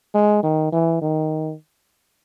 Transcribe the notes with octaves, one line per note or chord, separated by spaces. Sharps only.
G#3
D#3
E3
D#3